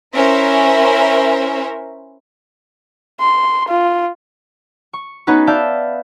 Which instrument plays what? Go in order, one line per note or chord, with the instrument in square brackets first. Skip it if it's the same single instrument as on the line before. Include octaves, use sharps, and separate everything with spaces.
[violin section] C#4 E4 A#4 C5 E5
[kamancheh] C6
F4
[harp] C#6
B3 C#4 D#4 F#4 B4
D5 E5 F5 A5 G6